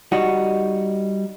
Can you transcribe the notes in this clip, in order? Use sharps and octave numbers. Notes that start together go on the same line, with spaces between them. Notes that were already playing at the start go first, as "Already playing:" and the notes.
G3 D#4 F#4